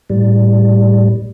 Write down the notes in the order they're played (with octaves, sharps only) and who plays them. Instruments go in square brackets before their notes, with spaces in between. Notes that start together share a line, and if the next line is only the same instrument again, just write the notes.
[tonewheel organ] A2 G3